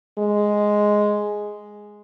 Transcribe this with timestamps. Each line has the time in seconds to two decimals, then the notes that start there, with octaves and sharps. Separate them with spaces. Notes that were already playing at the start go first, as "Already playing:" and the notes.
0.19 G#3